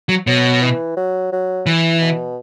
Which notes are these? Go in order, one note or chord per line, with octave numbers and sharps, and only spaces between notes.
F#3
B2 F#3
E3
F#3
F#3
E3
B2